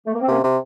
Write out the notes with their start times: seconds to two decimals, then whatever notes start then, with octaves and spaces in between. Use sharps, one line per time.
0.06 A3
0.13 A#3
0.21 C4
0.28 C3 A#3 C#4
0.44 C3